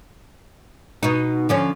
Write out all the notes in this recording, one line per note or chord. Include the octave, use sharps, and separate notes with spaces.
B2 D#4
D3 F3 C#4